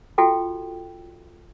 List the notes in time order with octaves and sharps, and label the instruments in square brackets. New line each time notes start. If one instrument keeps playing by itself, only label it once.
[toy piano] F4 F#4 A4 G5